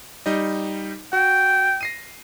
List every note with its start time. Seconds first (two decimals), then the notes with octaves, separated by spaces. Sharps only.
0.26 G3 D#4 D#5
1.13 F#4 G5
1.81 A#6 C7 D#7